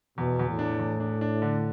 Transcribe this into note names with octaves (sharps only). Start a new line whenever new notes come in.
E2 B2
E2
A2
D4
E2
D4
D4
D3